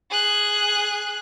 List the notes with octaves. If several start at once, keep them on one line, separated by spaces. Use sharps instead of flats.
G#4 F#6